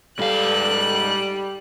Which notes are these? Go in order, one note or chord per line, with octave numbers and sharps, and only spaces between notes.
G#2 G3 A4 F5 F#6